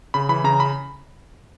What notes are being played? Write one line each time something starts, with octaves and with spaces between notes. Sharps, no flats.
C#3 B5
E3 B5
C#3 A#5
B5